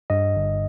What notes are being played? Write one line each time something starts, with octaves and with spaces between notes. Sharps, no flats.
G2 D#5
G1